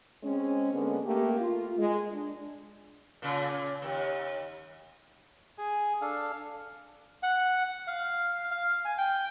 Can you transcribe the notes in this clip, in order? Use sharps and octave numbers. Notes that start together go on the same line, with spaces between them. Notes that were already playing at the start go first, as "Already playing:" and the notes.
G#3 C4 C#4
D3 G#3 A#3 B3 C#4
A3 A#3 G4
F4
G#3
D4
A#2 C#3
D#2
G#4 G#5
D4 A4 F5
F#5
F5
F5
G#5
G5